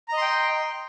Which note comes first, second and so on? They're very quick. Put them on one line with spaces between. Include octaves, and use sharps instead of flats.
A#5 D#5 C6 G5